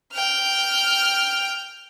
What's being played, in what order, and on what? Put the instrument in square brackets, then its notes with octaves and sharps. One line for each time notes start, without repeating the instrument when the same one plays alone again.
[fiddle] G5 F6